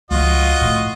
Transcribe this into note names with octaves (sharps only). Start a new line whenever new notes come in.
C#2 F3 F4 F#4 D#5
A2